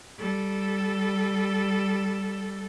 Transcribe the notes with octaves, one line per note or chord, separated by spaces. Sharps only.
G3 A4